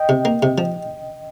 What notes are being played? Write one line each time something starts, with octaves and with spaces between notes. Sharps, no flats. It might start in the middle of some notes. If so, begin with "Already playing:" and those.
Already playing: D#5 G5
C3
A#3
C3
F3